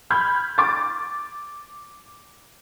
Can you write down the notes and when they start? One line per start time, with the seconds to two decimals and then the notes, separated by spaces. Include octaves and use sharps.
0.10 B5 F6 G6 G#6
0.58 D6 A6